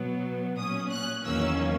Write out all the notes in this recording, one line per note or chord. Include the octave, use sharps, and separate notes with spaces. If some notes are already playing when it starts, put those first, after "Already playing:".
Already playing: B2 F#3 B3
A#2 F#3 C#4 D#6
F#6
E2 D#3 F#3 A#3 C#4 E6